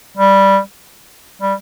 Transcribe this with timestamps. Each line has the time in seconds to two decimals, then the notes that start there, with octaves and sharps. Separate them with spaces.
0.17 G3
1.42 G3